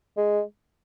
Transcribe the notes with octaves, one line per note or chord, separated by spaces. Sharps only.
G#3